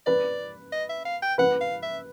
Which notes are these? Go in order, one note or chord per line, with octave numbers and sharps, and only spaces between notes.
B4 D5
D#5
E5
F5
G5
B4 F#5
F5
E5